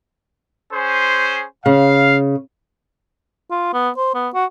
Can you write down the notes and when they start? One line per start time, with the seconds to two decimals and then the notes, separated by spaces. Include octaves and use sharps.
0.73 C#4 G#4 C5
1.66 C#3 F5
3.51 F4
3.73 B3
3.97 C5
4.14 B3
4.34 F#4